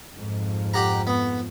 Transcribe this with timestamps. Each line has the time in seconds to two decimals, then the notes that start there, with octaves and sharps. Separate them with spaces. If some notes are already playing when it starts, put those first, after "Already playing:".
0.14 F2 G#2 F3
0.74 G4 F#5 A#5
1.07 B3